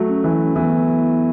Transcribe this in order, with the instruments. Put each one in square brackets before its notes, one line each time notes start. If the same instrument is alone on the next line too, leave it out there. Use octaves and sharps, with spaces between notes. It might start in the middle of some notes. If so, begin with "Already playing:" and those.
Already playing: [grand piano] F#3 A3
[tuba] C#4
[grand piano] E3
[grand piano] E3 [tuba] B3